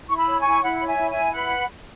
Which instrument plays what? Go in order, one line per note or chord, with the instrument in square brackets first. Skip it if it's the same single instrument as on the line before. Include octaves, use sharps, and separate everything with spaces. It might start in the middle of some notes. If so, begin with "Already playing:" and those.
[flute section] E4 C#6
B5 E6
C#5
G#5 C#6
E4
E4 F#5 B5
C#5 B5
E5 G#5
E4
E5 G#5
E4
B4 F#5 B5